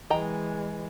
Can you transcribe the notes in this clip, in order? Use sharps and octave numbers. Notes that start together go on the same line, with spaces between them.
E3 G#3 D#5 G5 A#5